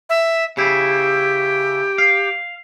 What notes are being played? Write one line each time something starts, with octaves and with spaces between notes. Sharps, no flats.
E5
C#3 E4 G4
F5